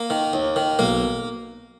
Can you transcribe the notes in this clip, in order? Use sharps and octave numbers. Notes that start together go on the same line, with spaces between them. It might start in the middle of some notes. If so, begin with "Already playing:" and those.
Already playing: A#3
D#3
D#2
D#3
B1 A#3